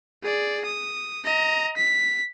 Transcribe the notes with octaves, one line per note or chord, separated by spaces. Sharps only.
G#4 D5
D#6
D#5 A#5
B6